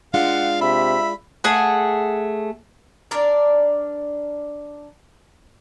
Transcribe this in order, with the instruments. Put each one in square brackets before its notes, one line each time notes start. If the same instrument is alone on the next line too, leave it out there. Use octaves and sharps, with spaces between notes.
[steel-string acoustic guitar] G#3 D4 F4 [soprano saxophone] F5 [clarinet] F#5
[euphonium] C3 [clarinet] E5 [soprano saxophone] B5
[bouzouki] A3 G#4 F#5
D4 A#4 D5